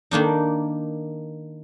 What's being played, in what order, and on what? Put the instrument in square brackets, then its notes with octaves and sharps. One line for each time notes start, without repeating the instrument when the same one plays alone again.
[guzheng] D#3 A#3 D4 D#4